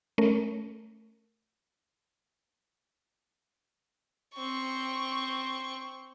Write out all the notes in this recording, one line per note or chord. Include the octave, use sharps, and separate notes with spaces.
A3 C#4 A#4
C4 C#6